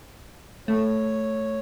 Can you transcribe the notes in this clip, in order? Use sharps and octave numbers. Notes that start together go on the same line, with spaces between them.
A3 C#5